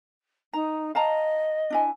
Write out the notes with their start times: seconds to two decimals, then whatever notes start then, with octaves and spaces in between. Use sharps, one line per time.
0.53 D#4 A#5
0.95 D#5 F5 A5 A#5
1.70 D4 E4 G#5